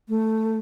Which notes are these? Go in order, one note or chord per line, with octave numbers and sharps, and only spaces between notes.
A3